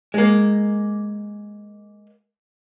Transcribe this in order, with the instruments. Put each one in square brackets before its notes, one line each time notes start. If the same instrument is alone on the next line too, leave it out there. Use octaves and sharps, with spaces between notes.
[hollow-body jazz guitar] G#3 A#3